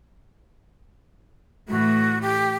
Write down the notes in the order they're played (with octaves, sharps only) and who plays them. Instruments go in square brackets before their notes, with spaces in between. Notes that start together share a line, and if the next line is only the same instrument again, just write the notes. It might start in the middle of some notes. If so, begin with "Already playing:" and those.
[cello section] A2 E3 A3 [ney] F#4
[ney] G4